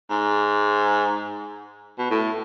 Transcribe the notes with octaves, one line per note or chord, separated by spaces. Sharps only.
G#2
B2
A2